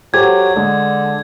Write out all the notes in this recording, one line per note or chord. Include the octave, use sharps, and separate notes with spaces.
F#3 G4 A4 C5 G#6
D3 G#3